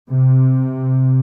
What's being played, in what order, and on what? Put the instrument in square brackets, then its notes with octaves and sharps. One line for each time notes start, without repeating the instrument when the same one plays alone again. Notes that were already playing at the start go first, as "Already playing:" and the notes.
[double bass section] C3